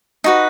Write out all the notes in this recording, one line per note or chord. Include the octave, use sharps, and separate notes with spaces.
D#4 F#4 B4